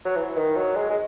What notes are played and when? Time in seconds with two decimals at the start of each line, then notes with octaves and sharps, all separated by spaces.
0.05 F#3
0.16 E3
0.36 D#3
0.56 F#3
0.76 G#3
0.90 G#3